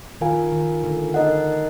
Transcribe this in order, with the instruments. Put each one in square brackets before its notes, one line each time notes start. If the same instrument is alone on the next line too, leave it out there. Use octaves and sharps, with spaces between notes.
[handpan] D#3 [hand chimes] F4 A#4 F5 G#5
[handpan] D#3
D3
[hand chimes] D#4 A#4 D#5 F#5